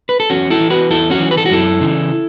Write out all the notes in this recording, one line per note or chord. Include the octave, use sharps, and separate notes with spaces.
B4
A4
E2 C#4 F#4
E4 A4
E3
F#4 B4
E2 E4 A4
C#4 F#4
E3
B4
A4
F#4
F#2 E4 A4
C#3 E3